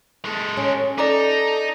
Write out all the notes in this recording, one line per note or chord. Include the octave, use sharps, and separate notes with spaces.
G#3 A4
C#4
D#4 A4 D5 A#5 D6